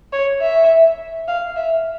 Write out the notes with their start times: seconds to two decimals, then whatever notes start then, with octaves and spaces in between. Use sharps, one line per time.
0.13 C#5
0.41 E5
1.28 F5
1.57 E5